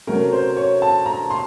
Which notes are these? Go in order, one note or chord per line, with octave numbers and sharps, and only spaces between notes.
C3 F#3 A3 C#4 A#4
C5
C#5
A5
A#5
C6